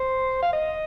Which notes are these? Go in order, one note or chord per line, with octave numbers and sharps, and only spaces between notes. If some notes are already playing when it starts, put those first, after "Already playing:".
Already playing: C5
F5
D#5